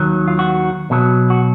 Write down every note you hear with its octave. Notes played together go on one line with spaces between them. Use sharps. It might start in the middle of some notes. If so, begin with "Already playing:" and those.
Already playing: D#2 D#3 F#3
F4
F#4
B1 B2 F#3
F#4